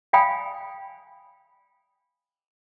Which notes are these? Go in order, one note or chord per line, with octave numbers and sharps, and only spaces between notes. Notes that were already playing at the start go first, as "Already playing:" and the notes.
D5 F5 G5 G#5 B5 D#6